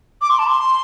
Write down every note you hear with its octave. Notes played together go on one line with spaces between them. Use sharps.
D6
C6
A5
C6